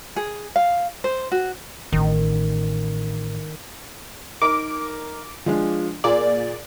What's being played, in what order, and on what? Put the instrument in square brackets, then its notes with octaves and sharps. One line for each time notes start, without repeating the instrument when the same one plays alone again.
[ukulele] G#4
F5
C5
F#4
[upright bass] A1 [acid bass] D#3
[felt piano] D#4 A#4 [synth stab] D6
[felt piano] F3 G#3 D4
[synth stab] A#2 D5 [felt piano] G#4